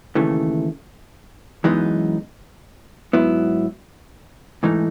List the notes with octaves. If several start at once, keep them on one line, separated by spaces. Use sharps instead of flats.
D#2 C#3 E3 A3
F#2 E3 G#3 B3 D#4
G#2 F#3 B3 E4
G#2 E3 A3 D#4